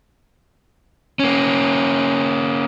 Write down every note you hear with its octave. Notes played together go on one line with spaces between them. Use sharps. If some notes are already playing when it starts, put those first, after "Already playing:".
A#3 C#4